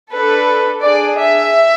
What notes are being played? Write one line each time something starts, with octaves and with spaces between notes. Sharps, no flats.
D4 A4 B4
D4 G#4 D5
E5